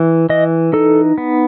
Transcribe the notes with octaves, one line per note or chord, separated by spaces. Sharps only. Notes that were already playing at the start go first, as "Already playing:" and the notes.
Already playing: E3
E3 D#5
D#4 A4
B3